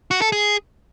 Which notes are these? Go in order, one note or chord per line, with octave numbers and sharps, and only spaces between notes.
F#4
A4
G#4